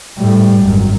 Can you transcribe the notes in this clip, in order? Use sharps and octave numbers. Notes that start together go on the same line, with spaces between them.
A2 G3
G#1 F#2